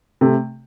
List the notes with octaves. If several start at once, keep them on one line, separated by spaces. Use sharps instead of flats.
C3 A3